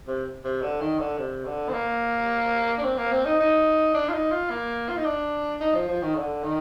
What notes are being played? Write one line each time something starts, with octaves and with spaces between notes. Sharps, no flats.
C3
C3
D3
D#3
D3
C3
D3
C4
A#3
D4
C4
A#3
C4
D#4
D#4
D4
F4
D#4
F4
A#3
F4
D#4
D4
D#4
F3
F3
D#3
D3
D#3